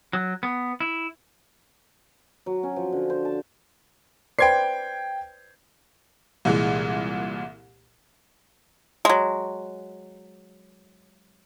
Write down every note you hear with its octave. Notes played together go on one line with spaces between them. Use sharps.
F#3
B3
E4
F#3
C#4
F3
D3
C5
A5
B4 C5 D5 G5 G#6 C7
C2 A#2 E3 G#3
F#3 G#3